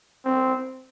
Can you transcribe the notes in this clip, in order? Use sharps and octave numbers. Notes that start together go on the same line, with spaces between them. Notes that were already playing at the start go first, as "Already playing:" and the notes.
C4